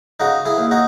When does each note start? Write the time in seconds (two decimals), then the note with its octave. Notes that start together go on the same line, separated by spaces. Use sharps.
0.20 C#3 D#4 F#4
0.45 E4 G#4
0.58 D#2
0.71 D#4 F#4